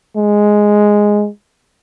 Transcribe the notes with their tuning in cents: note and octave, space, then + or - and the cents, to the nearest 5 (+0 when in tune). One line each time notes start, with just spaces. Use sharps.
G#3 +0